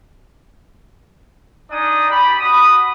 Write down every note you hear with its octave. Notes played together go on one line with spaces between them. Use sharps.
D4 D#4 D5 G#5 D#6
G4 B5
F#4 B5 D#6